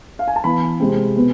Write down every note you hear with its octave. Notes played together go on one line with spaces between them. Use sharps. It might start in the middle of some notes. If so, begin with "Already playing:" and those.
F5
G#5
A5
E3 B3 B5
C3 G#3 C4
B2 B3